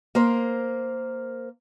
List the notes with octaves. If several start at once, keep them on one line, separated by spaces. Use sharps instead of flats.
A#3 A#4 C5